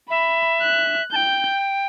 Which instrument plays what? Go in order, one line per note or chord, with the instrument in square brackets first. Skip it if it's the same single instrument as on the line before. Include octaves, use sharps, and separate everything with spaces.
[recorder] E5 [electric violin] B5
[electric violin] F#6
[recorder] A5 [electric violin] G6
[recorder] G5